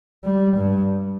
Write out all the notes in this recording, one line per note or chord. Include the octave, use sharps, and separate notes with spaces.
G3
G2